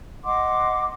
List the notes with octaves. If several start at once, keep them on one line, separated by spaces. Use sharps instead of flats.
D#5 F#5 C6 D6